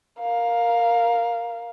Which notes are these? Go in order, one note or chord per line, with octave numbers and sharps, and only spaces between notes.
A#4 F5